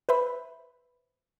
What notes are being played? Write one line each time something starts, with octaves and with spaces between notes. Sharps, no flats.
B4 C5 E5 B5